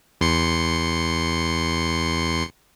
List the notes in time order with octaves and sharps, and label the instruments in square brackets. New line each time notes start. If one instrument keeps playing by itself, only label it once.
[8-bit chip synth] E2 C6 C#7